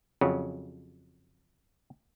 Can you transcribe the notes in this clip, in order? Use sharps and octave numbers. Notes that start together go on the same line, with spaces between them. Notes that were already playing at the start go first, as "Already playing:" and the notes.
F2 C#3 F#3